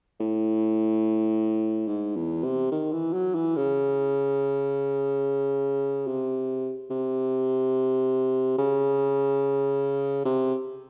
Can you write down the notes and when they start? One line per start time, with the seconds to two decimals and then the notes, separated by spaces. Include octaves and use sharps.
0.20 A2
1.88 G#2
2.17 E2
2.44 C3
2.72 D#3
2.92 E3
3.14 F#3
3.35 E3
3.56 C#3
6.07 C3
6.90 C3
8.58 C#3
10.25 C3